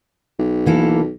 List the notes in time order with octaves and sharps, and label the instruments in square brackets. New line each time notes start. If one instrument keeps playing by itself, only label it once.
[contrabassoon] B1
[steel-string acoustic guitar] E3 A#3 A4